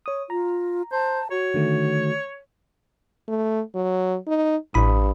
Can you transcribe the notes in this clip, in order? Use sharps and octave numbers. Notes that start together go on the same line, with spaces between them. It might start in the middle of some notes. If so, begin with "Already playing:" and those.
C#5 D#6
F4 A#5
C5 A5
F#4 C#5
D3 D#3 A3
A3
F#3
D#4
A1 G2 B5 D#6